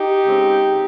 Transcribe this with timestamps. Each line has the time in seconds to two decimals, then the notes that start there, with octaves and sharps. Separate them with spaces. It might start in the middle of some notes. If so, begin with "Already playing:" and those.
Already playing: D#4 G4
0.24 C#3 G#3 C4